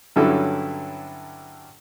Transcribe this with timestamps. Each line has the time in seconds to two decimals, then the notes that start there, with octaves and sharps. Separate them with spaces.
0.16 G2 D3 F#3 C#4 E4 A4